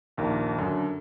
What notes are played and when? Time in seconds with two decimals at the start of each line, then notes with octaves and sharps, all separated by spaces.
0.17 A#1 D#2 A#4
0.58 F#2 D3